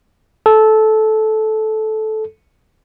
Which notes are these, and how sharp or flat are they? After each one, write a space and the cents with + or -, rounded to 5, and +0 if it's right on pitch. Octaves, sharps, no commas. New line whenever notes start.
A4 -15